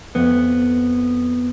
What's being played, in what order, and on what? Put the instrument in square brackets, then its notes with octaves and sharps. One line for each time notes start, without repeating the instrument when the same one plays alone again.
[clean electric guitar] F2 B3